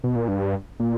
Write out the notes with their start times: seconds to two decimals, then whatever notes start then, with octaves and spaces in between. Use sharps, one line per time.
0.04 B2
0.16 A#2
0.28 G2
0.80 A#2